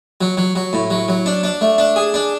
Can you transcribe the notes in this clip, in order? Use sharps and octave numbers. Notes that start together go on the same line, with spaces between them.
F#3
F#3
F#3
A2
F#3
F#3
D4
D4
A3
D4
G#4
D4